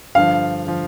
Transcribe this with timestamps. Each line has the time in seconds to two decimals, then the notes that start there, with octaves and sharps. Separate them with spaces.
0.15 G2 D3 F3 F5
0.66 D3 F3